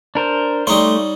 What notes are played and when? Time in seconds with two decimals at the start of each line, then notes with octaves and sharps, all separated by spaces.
0.15 D4 A#4 C5
0.67 G3 A3 D#4 C#5 C6